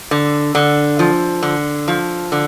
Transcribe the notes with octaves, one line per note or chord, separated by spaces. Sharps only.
D3
D3
F3
D3
F3
D3